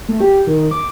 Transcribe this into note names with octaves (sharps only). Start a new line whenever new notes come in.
A3
G4
D#3
D6